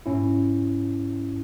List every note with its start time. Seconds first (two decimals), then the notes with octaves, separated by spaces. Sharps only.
0.06 G#2 C#4 E4